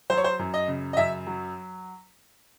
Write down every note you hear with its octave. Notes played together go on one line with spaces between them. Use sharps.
F#3 C5
C#5
C5
F#2
D#5
C#3
D#5
F#2 E5
F#3